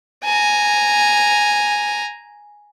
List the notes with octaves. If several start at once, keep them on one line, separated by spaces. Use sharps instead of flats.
G#5 A#5